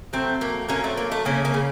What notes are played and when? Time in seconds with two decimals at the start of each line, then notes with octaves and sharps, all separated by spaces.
0.13 F#3 A3 C4
0.41 A3 A#3
0.69 F#3 A#3 C#4
0.84 A3 C4
0.97 A3 A#3
1.12 A3
1.25 C#3 A#3 C#4
1.45 A#3 C#4
1.54 C#3